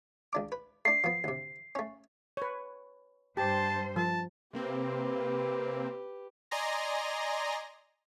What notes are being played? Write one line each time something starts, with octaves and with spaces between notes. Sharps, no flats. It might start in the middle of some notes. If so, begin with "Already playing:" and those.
C#2 D4 D6
B4
A3 D4 C7
F3 B3
D2 C3
A3 C#4
B4 C#5
G2 G4 C5 A5
F3 A5
C3 A#3 C4 G4 B4
D5 D#5 G#5 A#5 C6 A#6